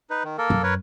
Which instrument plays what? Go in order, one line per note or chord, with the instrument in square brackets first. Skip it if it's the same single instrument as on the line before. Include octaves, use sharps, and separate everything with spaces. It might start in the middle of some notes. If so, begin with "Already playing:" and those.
[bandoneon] D#4 B4
D#3
A#3 A4 A#4
[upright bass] F#2
[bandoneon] A#4 B4 C#5